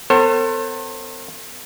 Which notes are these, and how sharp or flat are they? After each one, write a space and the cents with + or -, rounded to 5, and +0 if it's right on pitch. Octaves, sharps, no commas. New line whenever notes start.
B3 +35 A4 +45 C5 +40